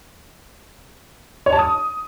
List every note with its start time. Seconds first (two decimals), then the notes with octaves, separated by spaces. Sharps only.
1.46 C#5
1.53 A5
1.59 D#6